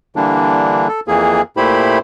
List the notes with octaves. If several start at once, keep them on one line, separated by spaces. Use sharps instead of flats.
D3 E3 G3 A#3 D4
A4
F2 E3 A#3 G#4
A#2 A3 E4 G4 C5 B5